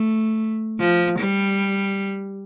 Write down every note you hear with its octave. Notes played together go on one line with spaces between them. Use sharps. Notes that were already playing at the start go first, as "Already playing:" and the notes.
Already playing: A3
F3
G3